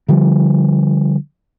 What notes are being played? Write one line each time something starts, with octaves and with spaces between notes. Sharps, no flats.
D3 F3 G3